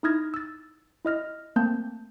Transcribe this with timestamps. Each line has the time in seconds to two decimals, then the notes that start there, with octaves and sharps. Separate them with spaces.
0.03 D#4 E4 D#6 F6 G#6 A#6
0.34 E6 A6
1.05 E4 D#5 F6 A#6
1.56 A3 A#3 C4 A5 G6